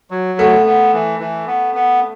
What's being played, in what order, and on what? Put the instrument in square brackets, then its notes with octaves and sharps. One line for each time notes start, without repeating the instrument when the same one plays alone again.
[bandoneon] F#3
[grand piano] A3 [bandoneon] B3
[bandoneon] B3
E3
E3
B3
B3